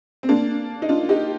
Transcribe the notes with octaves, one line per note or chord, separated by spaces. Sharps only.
C4
A#3 D4
D#4
D4 F4
D#4 G4